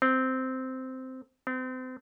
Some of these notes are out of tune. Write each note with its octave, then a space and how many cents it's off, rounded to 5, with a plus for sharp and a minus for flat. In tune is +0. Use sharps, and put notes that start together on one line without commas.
C4 -10
C4 -35